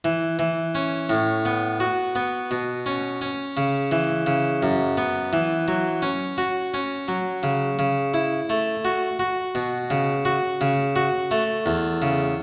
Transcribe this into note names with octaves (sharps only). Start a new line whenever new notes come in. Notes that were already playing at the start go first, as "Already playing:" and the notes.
E3
E3
C#4
A2
B3
F#4
B3
B2
C#4
C#4
C#3
E3
C#3
F#2
B3
E3
F#3
C#4
F#4
C#4
F#3
C#3
C#3
E4
A3
F#4
F#4
B2
C#3
F#4
C#3
F#4
A3
E2
C#3